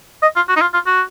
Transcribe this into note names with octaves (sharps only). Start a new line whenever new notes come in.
D#5
F4
F#4
D#4
F4
F4
F#4